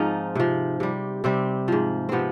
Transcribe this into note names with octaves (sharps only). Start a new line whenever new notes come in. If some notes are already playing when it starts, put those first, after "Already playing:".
Already playing: G#2 F3 C4 D#4 F4
C3 F3
C3 G3
C3 G3 C4
G#2 F3
C3 F3 B3 C4